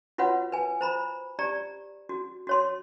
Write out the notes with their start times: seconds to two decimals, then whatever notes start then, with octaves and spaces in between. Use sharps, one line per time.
0.18 F4 F#4 B4 C#5 F#5
0.52 B4 G#5
0.81 C5 A#5 B5
1.39 G4 D5 A#5
2.09 F#4
2.47 F#4 C#5 C6